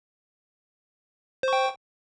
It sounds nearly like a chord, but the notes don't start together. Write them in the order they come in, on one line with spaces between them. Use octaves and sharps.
C5 C#6 G5